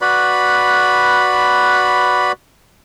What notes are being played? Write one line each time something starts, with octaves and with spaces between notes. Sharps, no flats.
F#4 B4 D5 B5